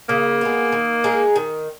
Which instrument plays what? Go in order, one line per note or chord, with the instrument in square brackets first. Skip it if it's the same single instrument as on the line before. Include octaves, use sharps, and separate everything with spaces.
[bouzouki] C#3 [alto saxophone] A#3
[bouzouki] G#3 B3
D#3
G#3 D#4 G#4
D#3